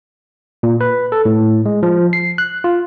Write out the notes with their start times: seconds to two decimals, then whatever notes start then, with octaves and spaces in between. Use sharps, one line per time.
0.63 A#2
0.81 B4
1.12 A4
1.25 A2
1.66 G#3
1.83 F3
2.13 C7
2.38 F#6
2.64 F4